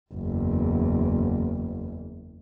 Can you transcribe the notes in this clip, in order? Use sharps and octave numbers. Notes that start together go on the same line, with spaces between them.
F#1 E2